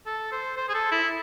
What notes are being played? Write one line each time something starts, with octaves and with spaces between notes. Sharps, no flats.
A4
C5
C5
G#4
A4
E4